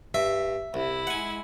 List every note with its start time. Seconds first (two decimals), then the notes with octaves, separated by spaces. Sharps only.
0.14 G2 E5
0.74 C2 E4
1.07 G#3 F#5 G#5